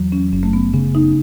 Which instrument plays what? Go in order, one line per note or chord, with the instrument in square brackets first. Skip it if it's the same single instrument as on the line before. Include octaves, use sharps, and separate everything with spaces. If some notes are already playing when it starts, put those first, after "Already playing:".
Already playing: [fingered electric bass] E2 F#3
[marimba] C#4
[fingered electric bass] F#1 [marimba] C#4
[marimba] A3
B3
[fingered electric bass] C#3 [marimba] C#4
[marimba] D#4